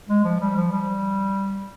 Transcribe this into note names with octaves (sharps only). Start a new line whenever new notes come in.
G#3
F3
G3
F3
G3